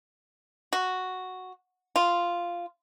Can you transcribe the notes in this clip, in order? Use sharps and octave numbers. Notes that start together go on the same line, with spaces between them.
F#4
F4